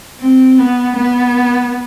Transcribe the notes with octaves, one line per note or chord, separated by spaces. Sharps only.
C4
B3
B3